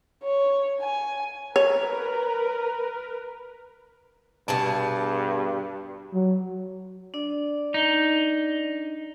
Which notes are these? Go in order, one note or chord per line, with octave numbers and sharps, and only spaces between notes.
C#5
G#5
A#4 B4 C#5
G2 B2 G#4 A5
F#3
D4 D5
D#4